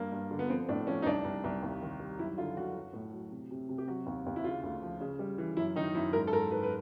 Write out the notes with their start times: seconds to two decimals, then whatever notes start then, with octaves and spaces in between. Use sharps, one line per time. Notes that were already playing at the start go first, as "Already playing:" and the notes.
Already playing: G2 A#3
0.12 G2
0.31 D3
0.39 B3
0.49 F3 C4
0.69 A2 D4
0.87 F3 C#4
1.02 D#4
1.06 C2 D4
1.25 C2
1.44 C2
1.62 D#2
1.82 D#3
2.00 G3
2.18 F#2 E4
2.37 D3 F4
2.56 F#2 F#4
2.75 F#3
2.93 A2
3.12 F#3
3.31 C3
3.51 C3
3.69 C3
3.78 G4
3.88 F#3 F#4
4.06 D#2
4.26 D#2
4.36 E4
4.44 C#3 F4
4.63 D2
4.82 F3
5.01 C#3
5.19 G3
5.38 E3
5.57 F#2 E4
5.75 D#3 D#4
5.95 F#2 E4
6.13 G#2 A#4
6.27 A4
6.32 G#2 A#4
6.51 G#2 B4
6.63 B4